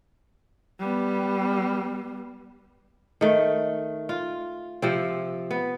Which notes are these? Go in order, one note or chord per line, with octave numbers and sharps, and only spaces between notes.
G3 B3
D#3 A3
F4
C3 F3 C4
B3